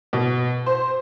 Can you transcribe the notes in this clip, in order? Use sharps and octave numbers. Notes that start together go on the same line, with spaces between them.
B2
C5